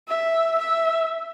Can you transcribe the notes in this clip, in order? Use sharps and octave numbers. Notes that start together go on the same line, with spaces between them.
E5
E5